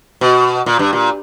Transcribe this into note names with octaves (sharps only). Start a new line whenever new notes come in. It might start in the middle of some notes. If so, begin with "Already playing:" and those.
B2
A#2
G2
A#2